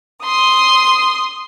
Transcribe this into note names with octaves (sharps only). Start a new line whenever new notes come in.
C6 D#6